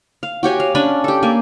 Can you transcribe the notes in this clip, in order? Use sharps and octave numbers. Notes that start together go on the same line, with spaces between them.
F5
F#4 G4 C#5 G#5
F5
C#4 D4 G#5 B5
G4 A4
A#3 G#5